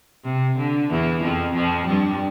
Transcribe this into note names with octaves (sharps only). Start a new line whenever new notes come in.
C3
D3
E2 E3
F2 F3
F2 F3
G2 G3